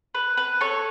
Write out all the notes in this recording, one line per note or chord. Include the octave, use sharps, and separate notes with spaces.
B4
B4
A4 C#5